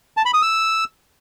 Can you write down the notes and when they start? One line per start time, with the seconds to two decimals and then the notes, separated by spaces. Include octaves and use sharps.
0.17 A5
0.25 B5
0.34 D#6
0.42 E6